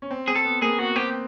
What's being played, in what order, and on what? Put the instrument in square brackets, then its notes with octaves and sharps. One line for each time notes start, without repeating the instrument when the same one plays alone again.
[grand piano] C#4
C4
[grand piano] C4 [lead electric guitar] G#4
[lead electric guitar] A4
[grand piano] B3
[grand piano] A#3 [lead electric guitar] G#4
[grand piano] B3 [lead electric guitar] F#4
[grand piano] C4 [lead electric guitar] G4